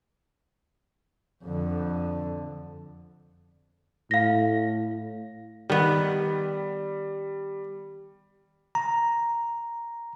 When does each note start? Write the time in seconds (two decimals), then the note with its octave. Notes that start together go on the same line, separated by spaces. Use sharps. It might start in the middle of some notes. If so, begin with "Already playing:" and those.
1.44 F2 D3
4.11 A2 F5 A#6
5.69 D#3 G3 B3
8.75 A#5